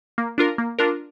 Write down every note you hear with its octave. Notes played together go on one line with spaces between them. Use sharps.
A#3
D4 F4 A#4
A#3
D4 F4 A#4